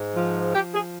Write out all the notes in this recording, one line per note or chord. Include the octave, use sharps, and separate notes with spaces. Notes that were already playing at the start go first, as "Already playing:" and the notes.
Already playing: G#2
F3
F3 G4
G#4